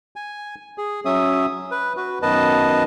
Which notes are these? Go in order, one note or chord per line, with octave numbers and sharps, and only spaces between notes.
G#5
G#4
F#3 C#4 E5 D#6
B4
F#4 B4
F#2 D#3 B3 B4 D#5 A5